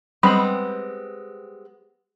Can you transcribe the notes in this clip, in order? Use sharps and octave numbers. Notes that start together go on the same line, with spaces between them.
G3 G#3 B3 C4 B5